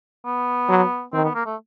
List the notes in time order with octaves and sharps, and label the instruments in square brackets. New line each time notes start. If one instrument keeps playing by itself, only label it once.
[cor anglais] B3
[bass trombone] F#3
[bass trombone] D#3 [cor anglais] C4
[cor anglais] B3
A#3
A3